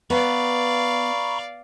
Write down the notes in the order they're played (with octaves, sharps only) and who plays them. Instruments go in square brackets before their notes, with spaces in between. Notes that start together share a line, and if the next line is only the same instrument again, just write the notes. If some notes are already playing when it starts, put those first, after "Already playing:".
[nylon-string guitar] B3 [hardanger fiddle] D5 F5 [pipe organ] A#5 B5 C#6